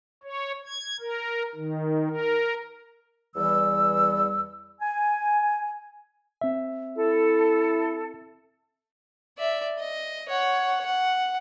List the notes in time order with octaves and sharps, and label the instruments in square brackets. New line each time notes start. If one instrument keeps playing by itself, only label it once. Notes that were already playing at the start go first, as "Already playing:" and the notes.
[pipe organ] C#5
G#6
A#4
D#3
A#4
[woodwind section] E2 E3 G3 E6
G#5
[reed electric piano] C4 E5
[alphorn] E4 [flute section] A4
[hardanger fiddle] D5 E5
D#5
C#5 F#5
F#5